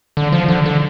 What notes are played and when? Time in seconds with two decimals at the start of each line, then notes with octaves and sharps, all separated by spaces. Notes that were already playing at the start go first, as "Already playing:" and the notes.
0.17 D3
0.32 F3
0.48 D3
0.66 D3